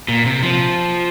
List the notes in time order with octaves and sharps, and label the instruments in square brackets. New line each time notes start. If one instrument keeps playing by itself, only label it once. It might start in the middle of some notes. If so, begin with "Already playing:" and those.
[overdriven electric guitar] A#2
C3
F3